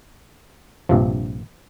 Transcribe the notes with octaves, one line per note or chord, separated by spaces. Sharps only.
A#1 G2 C3 F3